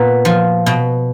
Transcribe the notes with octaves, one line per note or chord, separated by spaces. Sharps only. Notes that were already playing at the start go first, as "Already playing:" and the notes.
Already playing: A#2 B3 B4
F3
B2